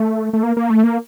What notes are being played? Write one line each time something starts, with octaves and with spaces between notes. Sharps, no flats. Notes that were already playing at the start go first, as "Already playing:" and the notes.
Already playing: A3
A3
A#3
A#3
A3
A#3